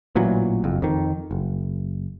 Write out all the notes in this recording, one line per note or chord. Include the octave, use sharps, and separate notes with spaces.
A1 A#2 E3 F#3
F#1 F2
F2 D#3
F#1